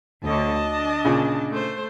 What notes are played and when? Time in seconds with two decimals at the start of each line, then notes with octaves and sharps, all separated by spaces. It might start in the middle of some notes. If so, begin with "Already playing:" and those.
0.24 D2 D3 C#5 D#5 A5
0.62 D4
1.05 A#2 C#3
1.51 A3 C5